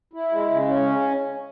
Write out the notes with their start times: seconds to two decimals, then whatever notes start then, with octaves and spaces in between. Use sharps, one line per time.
0.13 E4
0.32 G#3
0.50 C#3
0.69 C#4